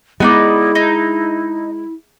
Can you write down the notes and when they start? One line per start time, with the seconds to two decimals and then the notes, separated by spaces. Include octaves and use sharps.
0.20 G#3 B3 D#4 E4 D5
0.75 D#4